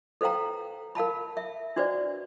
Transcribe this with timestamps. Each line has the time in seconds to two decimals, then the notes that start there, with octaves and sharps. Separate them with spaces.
0.21 A4 B4 C5 F5 G5 A#5
0.95 A#4 F5 A5 B5
1.37 E5
1.76 D4 F#4 B4 C5 D5